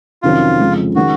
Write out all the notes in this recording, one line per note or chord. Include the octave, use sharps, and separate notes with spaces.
F2 C3 D#3 F#3 C#4 F4
F2 C#3 F3 G#3
D#3 G#3 C#4 F#4